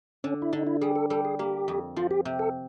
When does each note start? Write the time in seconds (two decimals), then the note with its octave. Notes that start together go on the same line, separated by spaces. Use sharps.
0.24 D3 C#4
0.42 E4
0.53 D3 D#4
0.67 E4
0.81 G3 G#4
0.96 A4
1.10 G3 A4
1.25 G#4
1.39 A#3 G4
1.68 F2
1.96 F3 F4
2.11 G4
2.25 C3
2.39 A4